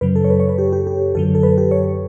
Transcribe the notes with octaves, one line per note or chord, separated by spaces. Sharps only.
F#2 C#3 F#3 B4
A4
C#5
B4
C#5
B4
G4
G4
G4
F#2 D3 F#3 A4
A4
B4
G4
C#5